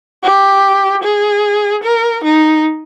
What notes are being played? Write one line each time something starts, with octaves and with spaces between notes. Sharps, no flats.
G4
G#4
A#4
D#4